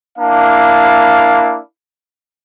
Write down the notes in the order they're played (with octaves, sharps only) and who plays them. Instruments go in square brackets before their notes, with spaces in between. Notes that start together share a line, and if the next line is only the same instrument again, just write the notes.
[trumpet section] A#3 D4 E4 F5